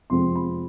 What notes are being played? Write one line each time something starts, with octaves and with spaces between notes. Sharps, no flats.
F2 C3 F3 G#3 C4 C6
B5